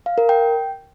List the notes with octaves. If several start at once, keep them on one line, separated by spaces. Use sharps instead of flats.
F5
A#4
G5